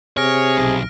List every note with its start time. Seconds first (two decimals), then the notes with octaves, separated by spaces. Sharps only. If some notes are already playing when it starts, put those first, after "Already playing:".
0.17 C3 G#4 C#5 F6 A#6 D7
0.58 B1